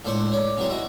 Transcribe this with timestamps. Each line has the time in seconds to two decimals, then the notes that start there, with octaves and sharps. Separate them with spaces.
0.05 C#2 A2 D4 C5 C6 C#6
0.32 C#5 D5
0.57 C3 E3 F#3 G3 G#4 C6
0.70 E4 F#4 D#5